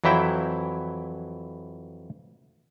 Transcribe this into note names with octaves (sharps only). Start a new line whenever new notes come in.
F2 E3 F#3 E4 E5 G5